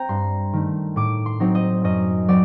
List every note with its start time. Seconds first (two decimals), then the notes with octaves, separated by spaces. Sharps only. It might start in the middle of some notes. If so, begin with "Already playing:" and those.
Already playing: C4 G5 A#5
0.09 G2 C6
0.53 D#3 A3
0.96 A2 D6
1.26 C6
1.40 F#3 C4 D#4
1.55 D#5
1.84 F#2 D#5
2.28 F#3 C4 D5